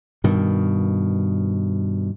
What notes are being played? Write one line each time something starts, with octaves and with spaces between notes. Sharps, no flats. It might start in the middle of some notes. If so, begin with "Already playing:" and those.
G2 B2 D#3